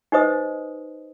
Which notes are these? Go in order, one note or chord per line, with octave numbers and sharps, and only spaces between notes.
D#4 G4 B4 C5 D#5 D#6